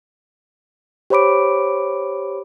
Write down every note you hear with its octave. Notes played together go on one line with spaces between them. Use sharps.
G4 C5 C#5 B5 D6 D7